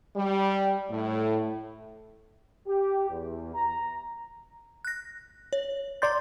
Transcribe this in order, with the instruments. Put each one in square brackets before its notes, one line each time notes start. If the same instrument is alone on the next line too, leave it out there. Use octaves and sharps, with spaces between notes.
[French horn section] G3
A2
[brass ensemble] G4
E2
A#5
[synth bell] F#6 A#6
C#5
[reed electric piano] D5 C6 G6 [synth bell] A#5 A6